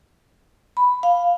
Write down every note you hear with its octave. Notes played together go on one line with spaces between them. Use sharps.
B5
F5